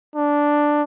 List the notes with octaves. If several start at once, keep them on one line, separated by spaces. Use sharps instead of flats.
D4